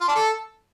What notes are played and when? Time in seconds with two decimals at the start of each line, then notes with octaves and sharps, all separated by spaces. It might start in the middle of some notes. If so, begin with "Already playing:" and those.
0.01 F4
0.08 D4
0.15 A4